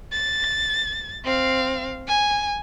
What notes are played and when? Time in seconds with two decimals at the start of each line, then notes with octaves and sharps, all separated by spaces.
0.12 A6
1.24 C4 F5
2.08 G#5